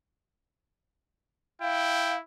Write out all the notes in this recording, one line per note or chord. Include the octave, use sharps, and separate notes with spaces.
E4 F5 G5